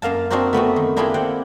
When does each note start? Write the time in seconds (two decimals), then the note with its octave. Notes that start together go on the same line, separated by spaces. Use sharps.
0.02 F#2 A#3 F5 A5
0.30 C4 D4 D#4 F#4 A#4 C5
0.53 A3 B3 C4 F#4
0.76 D#3
0.96 A#3 D4 E4 F4 G4 G#4
1.14 C4 F#5 G5